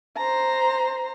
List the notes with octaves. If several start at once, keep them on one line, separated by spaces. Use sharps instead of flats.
C5 A#5